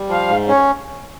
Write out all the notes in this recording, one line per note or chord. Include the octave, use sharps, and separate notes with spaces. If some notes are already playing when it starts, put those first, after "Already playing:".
Already playing: G3
F3 F5
G#2
C#4 C#5